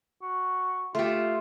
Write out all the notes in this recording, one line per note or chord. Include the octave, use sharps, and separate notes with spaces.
F#4
A3 F4 G4